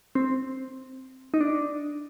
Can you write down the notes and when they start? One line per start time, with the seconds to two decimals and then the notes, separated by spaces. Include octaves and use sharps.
0.15 C4
1.34 D#4
1.41 D4